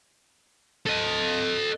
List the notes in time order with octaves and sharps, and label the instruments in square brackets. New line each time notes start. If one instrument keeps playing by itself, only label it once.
[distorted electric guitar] A4 D#5